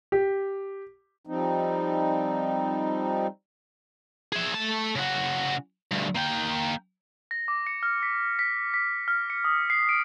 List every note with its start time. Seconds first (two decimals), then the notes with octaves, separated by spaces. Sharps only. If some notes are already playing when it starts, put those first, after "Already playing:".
0.12 G4
1.27 F3 G3 C4 D#4
4.33 G#4 E5
4.54 A3 A5
4.95 C#3 F#4
5.91 D2 G2
6.15 A#3 G5
7.31 A#6
7.48 D6
7.67 C#7
7.83 F6
8.03 B6
8.39 B6
8.74 B6
9.08 F6
9.30 C#7
9.44 D#6
9.70 C7
9.89 D7